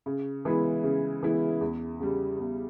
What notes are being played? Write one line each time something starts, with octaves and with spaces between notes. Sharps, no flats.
C#3
E3 G#3 B3 E4
C#3
E3 G#3 B3 E4
E2
C#3 G3
E2